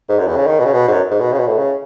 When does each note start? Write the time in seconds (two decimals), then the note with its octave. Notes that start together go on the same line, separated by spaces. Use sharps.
0.09 G#2
0.19 F#2
0.28 E2
0.36 C#3
0.47 D#3
0.60 B2
0.65 C#3
0.73 B2
0.88 G#2
0.92 F#2
1.11 G#2
1.20 B2
1.32 C#3
1.39 B2
1.47 A2
1.58 C#3